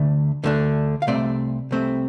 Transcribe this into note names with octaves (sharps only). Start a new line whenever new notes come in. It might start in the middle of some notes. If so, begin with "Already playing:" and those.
Already playing: D2 D3 A3
D2 D3 A3 D4
F5
C2 C3 A3 C4 D5
C2 C3 A3 C4